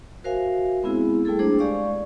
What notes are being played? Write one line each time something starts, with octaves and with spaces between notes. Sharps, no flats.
F#4 A#4 C5 E5 F5 G#5
G#3 B3 C4 E4 G#4
G3 A3 E4 G#4 A4
A#3 D4 G#4 C5
G#3 G4 D5 F5 C#6